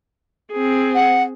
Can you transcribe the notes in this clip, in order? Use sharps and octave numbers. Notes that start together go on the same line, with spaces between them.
C4 G#4
F#5